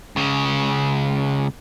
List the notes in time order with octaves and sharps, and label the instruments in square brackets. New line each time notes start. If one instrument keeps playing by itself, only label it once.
[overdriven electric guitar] C#2 C#3